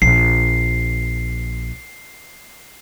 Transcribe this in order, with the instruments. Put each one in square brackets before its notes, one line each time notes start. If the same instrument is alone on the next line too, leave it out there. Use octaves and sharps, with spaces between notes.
[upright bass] A#1 [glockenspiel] C7